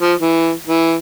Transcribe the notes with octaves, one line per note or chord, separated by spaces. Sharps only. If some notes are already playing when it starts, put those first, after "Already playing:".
F3
E3
E3